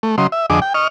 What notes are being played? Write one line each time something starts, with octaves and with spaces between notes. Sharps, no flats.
A3
C#3 F#3 D#5 C6
E5
F2 D3 G#4 D#5 D6
G5
D#5 C#6 F6